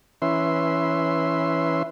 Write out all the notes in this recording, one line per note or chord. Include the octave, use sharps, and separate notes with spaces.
E3 C#4 B4 E5 C6